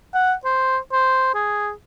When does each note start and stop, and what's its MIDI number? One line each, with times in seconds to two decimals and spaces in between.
0.14 0.33 78
0.45 0.78 72
0.92 1.34 72
1.34 1.71 68